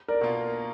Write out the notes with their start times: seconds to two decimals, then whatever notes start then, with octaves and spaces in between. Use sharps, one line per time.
0.08 A#4 D5
0.21 B2 A#3 F4